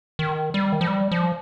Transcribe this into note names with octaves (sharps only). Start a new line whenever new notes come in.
D#3
G3
D#3
F3
G3
F3